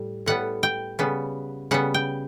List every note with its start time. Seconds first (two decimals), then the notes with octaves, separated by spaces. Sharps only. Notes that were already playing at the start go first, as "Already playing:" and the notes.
Already playing: A2 G3
0.26 A2 G3 B3 F#5
0.63 G5
0.99 C#3 G3 B3
1.71 C#3 G3 B3 F#5
1.94 G5